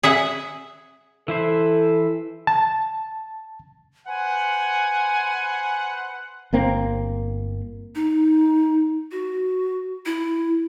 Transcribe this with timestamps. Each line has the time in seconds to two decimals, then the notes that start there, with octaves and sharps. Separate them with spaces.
0.03 G#4 E5 F#5
1.28 E3 E4 A4 C5
2.47 A5
4.08 B4 C5 F#5 G#5
6.53 G1 A#3 C4
7.95 D#4
9.11 F#4
10.06 E4